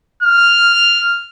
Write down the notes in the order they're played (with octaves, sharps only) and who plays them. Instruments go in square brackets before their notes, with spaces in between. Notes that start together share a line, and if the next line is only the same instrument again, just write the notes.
[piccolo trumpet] F6